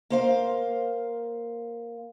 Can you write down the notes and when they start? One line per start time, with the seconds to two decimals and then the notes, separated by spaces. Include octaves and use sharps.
0.10 A#3 C5 F5